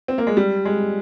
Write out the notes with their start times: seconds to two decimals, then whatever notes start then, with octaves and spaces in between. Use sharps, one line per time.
0.08 C4
0.18 A#3
0.27 G#3
0.37 G3
0.65 G#3